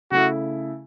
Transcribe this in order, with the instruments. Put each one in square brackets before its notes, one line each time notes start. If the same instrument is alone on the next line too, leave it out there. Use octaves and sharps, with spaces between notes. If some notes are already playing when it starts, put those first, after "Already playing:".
[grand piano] C#3 A3 E4 [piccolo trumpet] F#4